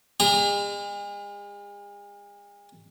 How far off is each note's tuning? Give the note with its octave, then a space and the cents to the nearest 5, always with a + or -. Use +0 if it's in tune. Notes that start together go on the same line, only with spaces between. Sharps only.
G#3 -40 G#4 -40 A#5 +0